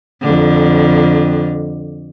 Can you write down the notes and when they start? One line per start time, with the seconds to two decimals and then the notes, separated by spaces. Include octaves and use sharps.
0.22 F2 D3